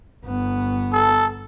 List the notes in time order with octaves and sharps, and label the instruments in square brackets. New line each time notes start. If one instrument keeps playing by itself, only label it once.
[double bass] G1 B3
[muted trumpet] A4